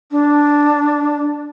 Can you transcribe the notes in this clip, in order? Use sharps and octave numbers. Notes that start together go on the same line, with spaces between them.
D4